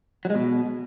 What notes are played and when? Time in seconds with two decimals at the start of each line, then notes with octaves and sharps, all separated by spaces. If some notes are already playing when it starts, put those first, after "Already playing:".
0.25 F#3
0.30 G#3
0.35 B2